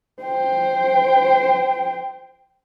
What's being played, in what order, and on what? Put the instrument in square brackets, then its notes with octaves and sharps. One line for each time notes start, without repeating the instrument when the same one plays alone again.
[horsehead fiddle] C5 G5